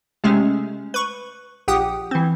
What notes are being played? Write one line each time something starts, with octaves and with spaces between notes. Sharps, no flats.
C3 G#3 A3 C#4
B4 C#6
A#1 G4 F#5 G5 D#6
E3 C4